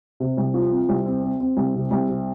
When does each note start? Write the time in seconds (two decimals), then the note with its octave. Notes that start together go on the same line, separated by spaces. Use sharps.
0.20 C3
0.37 C2
0.54 F3
0.71 C4
0.89 C2
1.06 C4
1.23 C4
1.40 C4
1.57 C2
1.75 C3
1.91 C2
2.09 C3